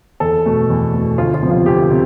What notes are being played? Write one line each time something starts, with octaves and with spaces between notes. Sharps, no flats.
E2 A4
B2 A3
E2
B2 A3
D2 F4
F4
C3 F3 B3
F4
D2 G4
C3